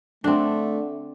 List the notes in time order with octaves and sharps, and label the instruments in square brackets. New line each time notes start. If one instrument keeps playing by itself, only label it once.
[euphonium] D3 [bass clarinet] A3 [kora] C4 D4